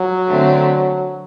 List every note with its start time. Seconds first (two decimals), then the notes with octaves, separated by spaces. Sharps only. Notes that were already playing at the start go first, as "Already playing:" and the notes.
Already playing: F#3
0.28 D3 A3 C4